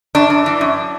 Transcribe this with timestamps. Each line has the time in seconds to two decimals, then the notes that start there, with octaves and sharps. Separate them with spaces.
0.15 F#2 D4
0.30 F#2
0.46 E3
0.61 F#2